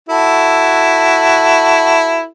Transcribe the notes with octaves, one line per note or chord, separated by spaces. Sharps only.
E4 F#4 A4